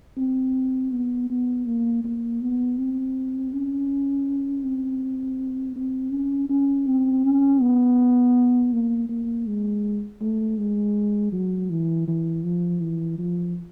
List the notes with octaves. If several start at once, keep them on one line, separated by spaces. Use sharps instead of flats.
C4
B3
B3
A#3
A#3
B3
C4
C#4
C4
C4
C#4
C#4
C4
C#4
B3
A#3
A#3
G#3
A3
G#3
F#3
E3
E3
F3
E3
F3